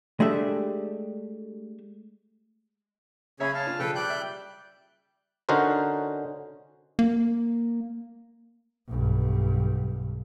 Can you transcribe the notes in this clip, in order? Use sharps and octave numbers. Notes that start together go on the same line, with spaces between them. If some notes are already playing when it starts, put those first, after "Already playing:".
G#3 A3 D4 G4 E5
C#3 C#4 G#4 C#5 E5 B5
F5 A5
D4 F4
C#3 F3 A4 B4 G5
G3 D5 G5 F#6 G6
E5
D3 C#4 D#4 F#4 A#4 C5
A#3
B1 G2